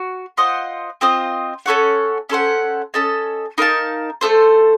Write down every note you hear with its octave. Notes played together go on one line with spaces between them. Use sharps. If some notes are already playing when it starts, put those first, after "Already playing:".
Already playing: F#4
F4 C5 D#5 F#5
C4 F4 C5 D#5
C#4 A4 C#5 F#5
C#4 A4 C5 F#5
C#4 A4 D#5 A5
D#4 A#4 F5 A5
A3 D#4 A4 C5